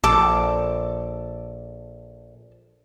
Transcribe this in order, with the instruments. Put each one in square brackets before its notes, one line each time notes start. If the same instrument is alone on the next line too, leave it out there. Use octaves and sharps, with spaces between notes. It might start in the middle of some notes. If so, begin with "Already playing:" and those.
[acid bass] A#1 [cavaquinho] A4 D6